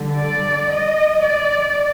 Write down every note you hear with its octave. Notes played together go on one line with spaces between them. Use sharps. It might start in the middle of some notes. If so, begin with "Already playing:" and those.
Already playing: D3 G3
D5
D#5
D5